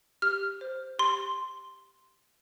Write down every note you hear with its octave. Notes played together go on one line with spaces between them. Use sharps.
G4 F6
C5
G4 C6